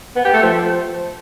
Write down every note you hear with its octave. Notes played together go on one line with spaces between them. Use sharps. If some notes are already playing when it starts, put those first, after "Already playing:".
B3
G4
A3
F3